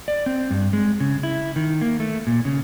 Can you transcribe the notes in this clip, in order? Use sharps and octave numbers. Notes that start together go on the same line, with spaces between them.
D5
C4
G2
G#3
C#3
E4
D#3
A#3
A3
A#2
C#3